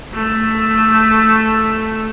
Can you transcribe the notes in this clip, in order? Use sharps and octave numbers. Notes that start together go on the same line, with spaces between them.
A3 E6